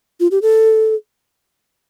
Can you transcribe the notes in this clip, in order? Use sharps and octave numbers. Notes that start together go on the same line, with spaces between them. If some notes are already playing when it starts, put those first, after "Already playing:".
F4
G4
A4